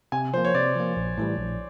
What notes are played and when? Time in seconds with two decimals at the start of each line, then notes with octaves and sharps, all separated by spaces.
0.12 C3 G#5
0.34 F3 A#3 C5
0.45 C#5
0.55 C3 D5
0.75 F3 A#3
0.97 A#1
1.18 A2 E3 G3
1.39 A#1